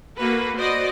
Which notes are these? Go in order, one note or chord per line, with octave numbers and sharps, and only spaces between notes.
A#3 F#4 A4 B4
F#4 C5 D5 D#5